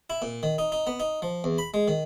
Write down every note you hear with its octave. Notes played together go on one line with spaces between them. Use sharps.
E4
A#2
D#3
D#4
D#4
B3
D#4
F3
E2
B5
G#3
D#3